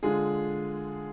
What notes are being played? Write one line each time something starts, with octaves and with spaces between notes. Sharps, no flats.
D3 G#3 F4 G#4